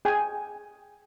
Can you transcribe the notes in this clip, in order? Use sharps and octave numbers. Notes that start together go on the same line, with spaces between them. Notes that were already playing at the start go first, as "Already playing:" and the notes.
G#4 G5 G#5